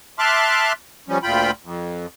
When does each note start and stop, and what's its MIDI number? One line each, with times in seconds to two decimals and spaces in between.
0.19 0.73 76
0.19 0.73 81
0.19 0.73 84
0.19 0.73 86
0.19 0.73 89
0.19 0.73 90
1.08 1.18 53
1.08 1.18 55
1.08 1.18 61
1.23 1.51 38
1.23 1.51 46
1.23 1.51 65
1.23 1.51 79
1.23 1.51 83
1.62 2.06 41